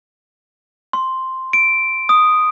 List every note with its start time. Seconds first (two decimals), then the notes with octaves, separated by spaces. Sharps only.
0.93 C6
1.53 D7
2.09 D#6